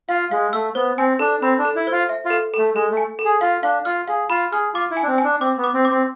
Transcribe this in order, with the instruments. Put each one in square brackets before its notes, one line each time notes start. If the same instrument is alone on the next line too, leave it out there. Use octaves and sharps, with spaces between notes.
[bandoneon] F4 [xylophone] F5
[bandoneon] G#3 [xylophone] F5
[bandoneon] A3 [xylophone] E6
[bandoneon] B3 [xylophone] C5
[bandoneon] C4 [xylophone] G#5
[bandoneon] D4 [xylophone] A4
[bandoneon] C4 [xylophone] B5
[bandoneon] D4
[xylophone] A4
[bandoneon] E4
[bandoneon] F4 [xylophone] C5
[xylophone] E5
[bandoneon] F4
[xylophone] A4
[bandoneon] A3 [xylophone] A4
[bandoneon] G#3 [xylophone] A4
[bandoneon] A3
[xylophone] G#5
A4
[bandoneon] G#4
[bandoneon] F4 [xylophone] F5
[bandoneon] D4 [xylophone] F5
[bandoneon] F4 [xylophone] F6
[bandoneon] G#4 [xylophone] F5
[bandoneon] F4 [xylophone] B5
[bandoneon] G#4 [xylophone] F6
[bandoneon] F4 [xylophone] D6
[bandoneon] E4
[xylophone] G#5
[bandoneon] D4
C4
[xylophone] G#5
[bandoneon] D4
[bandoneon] C4 [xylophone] D6
[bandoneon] B3
[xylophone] D6
[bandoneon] C4
[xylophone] D6
[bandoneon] C4